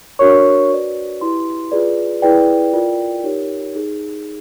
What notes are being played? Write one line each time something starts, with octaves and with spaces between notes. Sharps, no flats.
D4 F#4 A#4 C#5 C#6
F#4 B4 D5
E4 G4 B4 C6
F4 G#4 B4 D5
E4 G#4 B4 D5 G5
F4 A#4 D5
D#4 G4 A#4 C#5
D#4 G#4